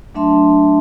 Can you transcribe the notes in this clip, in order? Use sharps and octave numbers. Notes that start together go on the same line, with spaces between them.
F#3 A3 D4 E5 A5 C6